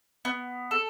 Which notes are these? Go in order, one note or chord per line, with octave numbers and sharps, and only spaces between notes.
B3
A4